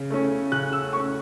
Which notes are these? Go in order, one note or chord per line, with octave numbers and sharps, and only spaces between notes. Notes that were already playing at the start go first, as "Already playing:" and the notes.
Already playing: C#3
A3 C#4
C#3 F#6
E6
A3 C#4 C#6